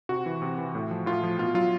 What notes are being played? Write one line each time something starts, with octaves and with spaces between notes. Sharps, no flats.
C3 F#4
E3
C3
E3
A2
F3
A2 F4
F3
B2 F4
F#3 F4